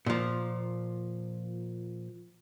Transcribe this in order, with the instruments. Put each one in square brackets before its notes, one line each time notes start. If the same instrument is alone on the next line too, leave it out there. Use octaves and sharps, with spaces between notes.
[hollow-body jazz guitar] A#2 F3